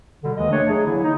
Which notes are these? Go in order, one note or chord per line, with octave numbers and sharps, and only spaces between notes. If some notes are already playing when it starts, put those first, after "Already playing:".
B2 D3 G3
D#2 D#3 E3 G#3 D#5
A3 D4 C#5
F#3 G#3 G#4
D3 E3 F#3 A#3 E4
D#4